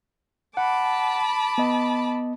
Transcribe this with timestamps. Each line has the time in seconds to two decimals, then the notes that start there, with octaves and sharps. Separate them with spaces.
0.57 F#5 A5 B5 D6
1.58 B3 D#5